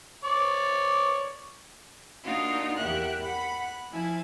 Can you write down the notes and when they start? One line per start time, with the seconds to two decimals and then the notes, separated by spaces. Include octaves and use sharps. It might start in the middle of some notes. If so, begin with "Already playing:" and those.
0.24 C#5 D5
2.24 A#3 D4 D#4 F4 F#4 F5
2.76 E2 G4 A#4 E5 F#5 F#6
3.21 F#5 B5
3.61 F#6
3.91 F3 E4 G#5 A5